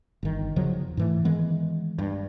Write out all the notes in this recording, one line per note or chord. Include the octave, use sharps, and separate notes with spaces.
G1 D#3
E2 C#3 F3 F#3
G#2 E3 A3
D#3 E3 G#3 B3
G2